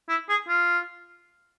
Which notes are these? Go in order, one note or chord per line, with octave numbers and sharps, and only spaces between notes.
E4
G#4
F4